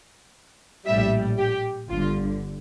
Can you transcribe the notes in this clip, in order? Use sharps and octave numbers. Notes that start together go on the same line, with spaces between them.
A#1 A2 G3 E5
G4
G1 G2 D3 F4